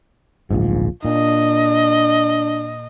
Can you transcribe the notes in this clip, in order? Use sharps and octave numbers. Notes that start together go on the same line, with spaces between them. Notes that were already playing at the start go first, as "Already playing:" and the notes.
D1 A#1 G#2 F4
A#2 D4 D#5